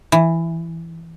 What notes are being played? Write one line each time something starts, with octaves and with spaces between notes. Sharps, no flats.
E3